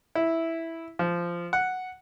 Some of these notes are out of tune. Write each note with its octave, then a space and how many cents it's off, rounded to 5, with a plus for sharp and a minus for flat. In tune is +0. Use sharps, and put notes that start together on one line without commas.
E4 -5
F3 -15
F#5 +0